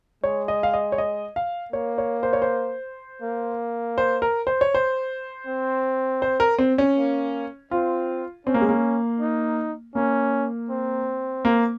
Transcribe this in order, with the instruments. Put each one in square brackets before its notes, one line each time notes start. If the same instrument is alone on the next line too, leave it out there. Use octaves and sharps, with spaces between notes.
[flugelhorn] G#3 [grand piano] C#5
[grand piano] D#5
F5
D#5
C#5
D#5
F5
[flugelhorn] A#3 [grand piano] C#5
[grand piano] C#5
C5
C#5
C5
[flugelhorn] A#3
[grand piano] C5
A#4
C5
C#5
C5
[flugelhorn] C4
[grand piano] C5
A#4
C4
C#4
[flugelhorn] A#3
[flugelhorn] C4 [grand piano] F4
[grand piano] C4 [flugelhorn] C#4
[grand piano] A#3
G#3
A#3
[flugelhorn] D#4
[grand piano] A#3 [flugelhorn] C#4
[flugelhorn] C4
[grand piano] A#3